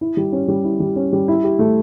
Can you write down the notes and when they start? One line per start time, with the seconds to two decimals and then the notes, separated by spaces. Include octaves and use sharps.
0.01 E4
0.17 G3
0.33 C#4
0.48 G3
0.64 E4
0.80 G3
0.96 C#4
1.13 G3
1.28 E4
1.44 G4
1.59 A3